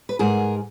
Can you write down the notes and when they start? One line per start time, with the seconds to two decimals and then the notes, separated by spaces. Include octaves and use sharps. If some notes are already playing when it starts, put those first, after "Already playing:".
0.09 B4
0.19 G#2 G#4 A#4